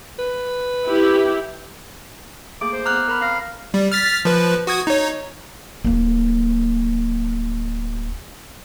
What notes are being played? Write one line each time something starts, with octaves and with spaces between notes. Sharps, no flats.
B4
E4 G4
A3 A#3 G#4 D6
C5
B3 A#5 D6 F6 F#6
A#4 A#5 B5
C4 F5 A#6
G3
F6 A6 B6
F3 B4
F#4 D#6 G#6
D#4 C#5
D1 A#3